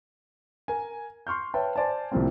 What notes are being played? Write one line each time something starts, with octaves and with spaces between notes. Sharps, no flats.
A#4 G#5
C6 C#6 F6 G6
B4 C#5 E5 G5 A5
C5 D5 G#5 A5
C2 A2 F3 G3 A#3 C4